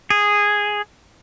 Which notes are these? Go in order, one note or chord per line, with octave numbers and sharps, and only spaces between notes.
G#4